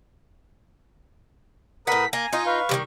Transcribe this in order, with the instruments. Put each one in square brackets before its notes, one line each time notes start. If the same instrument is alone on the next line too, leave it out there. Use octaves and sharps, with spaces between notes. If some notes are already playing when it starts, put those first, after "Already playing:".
[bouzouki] A2 F#5 [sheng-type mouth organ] A#4 B4 D#6 [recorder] B6
[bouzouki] A#3 [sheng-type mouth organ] G#5 [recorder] A#5
[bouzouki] D#4 F4 [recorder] D#6
[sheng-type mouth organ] B4 F5 [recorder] C#6
[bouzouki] D#3 E3 G3